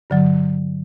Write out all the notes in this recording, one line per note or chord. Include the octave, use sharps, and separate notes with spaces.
G2 D3 F#3